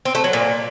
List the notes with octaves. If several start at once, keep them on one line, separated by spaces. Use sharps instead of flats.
C4
A3
F#3
A#2